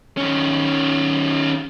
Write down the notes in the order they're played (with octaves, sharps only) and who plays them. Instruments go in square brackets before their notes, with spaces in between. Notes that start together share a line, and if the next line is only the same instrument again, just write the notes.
[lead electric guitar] D#3 C#4